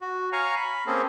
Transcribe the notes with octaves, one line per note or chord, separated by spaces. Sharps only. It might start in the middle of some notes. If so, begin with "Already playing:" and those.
F#4
C#5 F5 G#5 A#5 C#6
B5
A#3 C4 C#4 G#4 A4